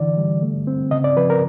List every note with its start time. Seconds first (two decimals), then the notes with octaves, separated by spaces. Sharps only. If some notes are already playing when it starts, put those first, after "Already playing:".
Already playing: D3 E3 D5
0.17 G3
0.42 A3
0.67 C4
0.91 C#3 D#5
1.04 D5
1.16 F3 B4
1.30 A#4